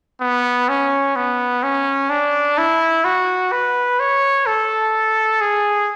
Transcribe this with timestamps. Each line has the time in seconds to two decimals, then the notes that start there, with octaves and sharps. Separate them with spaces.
0.21 B3
0.69 C#4
1.16 B3
1.63 C#4
2.10 D4
2.58 E4
3.04 F#4
3.52 B4
4.00 C#5
4.46 A4
5.41 G#4